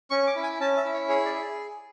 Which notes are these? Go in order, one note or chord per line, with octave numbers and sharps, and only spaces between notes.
C#4 C#6
D6
E4
G#5
C#4 A5
E5
E4
C#5
G#4 C#5
D5
G#4